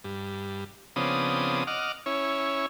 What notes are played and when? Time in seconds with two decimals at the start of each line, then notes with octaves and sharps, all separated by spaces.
0.04 G2
0.96 C#3 F3 B3 C4 D4 D#6
1.67 D#5 F#5 D6 F6
2.06 C#4 E4 C#5